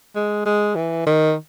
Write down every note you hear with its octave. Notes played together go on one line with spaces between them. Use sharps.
G#3
G#3
E3
D#3